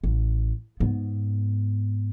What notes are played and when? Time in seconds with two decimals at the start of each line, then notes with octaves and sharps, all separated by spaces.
0.04 A1
0.80 G#2 B3